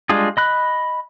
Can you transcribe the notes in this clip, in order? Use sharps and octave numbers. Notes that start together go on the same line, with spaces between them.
G3 G#3 D4 F4 G#4
D#5 B5 F#6